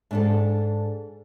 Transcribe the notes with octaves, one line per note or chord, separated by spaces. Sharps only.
G#2 D4 A4